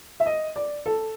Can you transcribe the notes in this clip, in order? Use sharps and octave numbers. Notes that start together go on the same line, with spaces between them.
E5
D#5
D5
A4